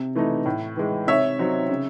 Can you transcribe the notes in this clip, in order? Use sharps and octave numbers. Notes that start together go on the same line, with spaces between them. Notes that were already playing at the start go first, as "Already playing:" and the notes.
Already playing: C3
E3 A3 D#4
A2
E3 G#3
C3 C#5 E5
F#3 C4 D#4
C#3